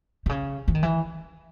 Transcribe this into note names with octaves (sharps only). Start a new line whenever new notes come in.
C3
C#3
E3
D#3
E3